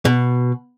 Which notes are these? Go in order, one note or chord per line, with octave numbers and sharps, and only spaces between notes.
B2